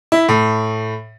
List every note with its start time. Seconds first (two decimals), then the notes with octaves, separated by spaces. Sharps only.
0.12 E4
0.29 A2